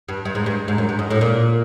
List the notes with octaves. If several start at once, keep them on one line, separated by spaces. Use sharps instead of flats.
G2
G2
G#2
G2
G#2
F#2
G2
G#2
A2
A#2